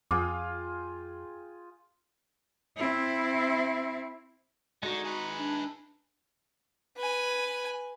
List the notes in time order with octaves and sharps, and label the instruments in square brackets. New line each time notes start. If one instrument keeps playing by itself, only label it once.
[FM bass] F2 [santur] F4 G#4 G5 [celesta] D6
[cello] C4 E4
[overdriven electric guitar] D3 [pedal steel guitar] G#3 D#4 [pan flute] F#4
[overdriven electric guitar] G#4 B4
[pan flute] D4
[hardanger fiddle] B4 G#5